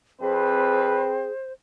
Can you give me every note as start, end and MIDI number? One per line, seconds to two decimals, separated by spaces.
0.22 1.11 41
0.22 1.28 60
0.22 1.32 68
0.22 1.11 71
0.22 1.52 72